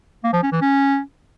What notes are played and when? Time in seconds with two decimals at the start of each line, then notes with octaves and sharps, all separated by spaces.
0.24 A#3
0.34 F3
0.43 C#4
0.52 E3
0.62 C#4